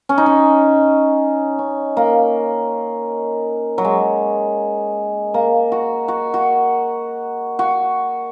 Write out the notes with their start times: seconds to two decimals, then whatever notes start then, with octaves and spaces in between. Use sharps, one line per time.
0.09 C#4
0.18 D#4
0.26 C#4
1.59 C#4
1.97 A#3
3.78 F#3
3.85 G#3
5.34 A#3
5.72 F#4
6.08 F#4
6.34 F#4
7.59 F#4